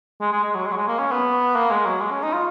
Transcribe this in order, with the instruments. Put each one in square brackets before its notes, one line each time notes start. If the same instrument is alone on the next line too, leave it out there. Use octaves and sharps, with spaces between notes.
[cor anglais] G#3
G#3
G#3
F#3
G#3
F#3
G#3
A#3
C#4
B3
A#3
G#3
F#3
G#3
C#4
D#4
F4